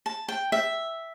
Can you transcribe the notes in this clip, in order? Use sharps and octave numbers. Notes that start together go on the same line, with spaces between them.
A5
G5
E5